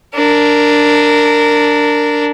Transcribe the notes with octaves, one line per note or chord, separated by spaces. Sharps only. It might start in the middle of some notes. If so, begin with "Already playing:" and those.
D4 A#4